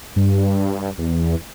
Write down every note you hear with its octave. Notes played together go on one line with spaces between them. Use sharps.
G2
E2